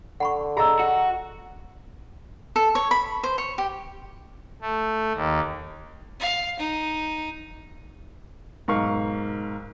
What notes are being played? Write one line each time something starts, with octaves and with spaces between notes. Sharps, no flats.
D3 F#5 B5 C#6
G#4 D#5 A#5 E6
F#4
A4
C#5
B5
C5
C#5
G4
A3
D#2
F5
D#4
B1 G#2 A#4 F5 C#6